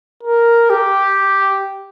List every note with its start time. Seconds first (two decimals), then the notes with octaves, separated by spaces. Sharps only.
0.23 A#4
0.70 G4